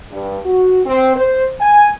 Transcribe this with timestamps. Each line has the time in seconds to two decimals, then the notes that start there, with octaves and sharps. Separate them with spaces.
0.11 G2
0.45 F#4
0.86 C4
1.16 C5
1.60 G#5